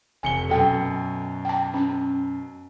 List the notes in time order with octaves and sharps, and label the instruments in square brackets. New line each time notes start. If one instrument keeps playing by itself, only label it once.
[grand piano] F1 C#7 G7 [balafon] G#5
[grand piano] F#2 B2 [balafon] A4 G5
[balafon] G5 A5
C#4 A5